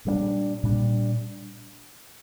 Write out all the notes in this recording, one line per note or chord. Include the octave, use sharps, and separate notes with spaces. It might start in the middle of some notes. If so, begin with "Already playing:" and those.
A#2 G3 B3 D4
A#2 G3 B3 D4